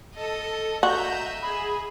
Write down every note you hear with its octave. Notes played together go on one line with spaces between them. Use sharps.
A4 D#5
F#4 D#5 E5 A#5 G6
G#4 B5